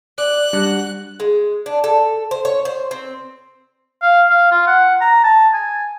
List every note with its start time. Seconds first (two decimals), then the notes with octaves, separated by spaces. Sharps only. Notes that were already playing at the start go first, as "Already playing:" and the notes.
0.18 D5 F#6
0.53 G3 D4 F#4
1.20 G#3
1.66 D4
1.84 A4
2.31 C5
2.45 C#5
2.65 C5
2.91 C4
4.02 F5
4.30 F5
4.51 F4
4.67 F#5
5.01 A#5
5.24 A5
5.54 G#5